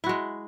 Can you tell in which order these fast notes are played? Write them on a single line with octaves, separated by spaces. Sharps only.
E4 F#4 G#3